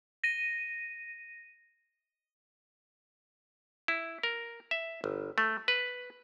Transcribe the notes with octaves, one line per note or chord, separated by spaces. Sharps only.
A#6 D#7
E4
A#4
E5
G1
A3
B4